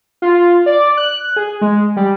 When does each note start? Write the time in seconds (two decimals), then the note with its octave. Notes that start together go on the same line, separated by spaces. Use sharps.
0.22 F4
0.66 D5
0.97 F#6
1.36 G#4
1.61 G#3
1.97 G3